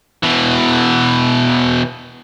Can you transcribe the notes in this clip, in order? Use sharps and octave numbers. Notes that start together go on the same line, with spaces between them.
B2 E3